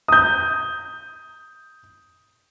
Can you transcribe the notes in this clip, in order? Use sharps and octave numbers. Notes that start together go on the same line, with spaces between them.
D#6 G6